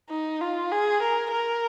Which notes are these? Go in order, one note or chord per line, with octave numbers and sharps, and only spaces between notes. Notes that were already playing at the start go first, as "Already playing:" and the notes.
D#4
F4
G#4
A#4
A#4